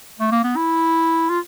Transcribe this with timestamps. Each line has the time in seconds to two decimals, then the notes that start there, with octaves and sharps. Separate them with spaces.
0.20 A3
0.32 A#3
0.44 B3
0.57 E4
1.30 F4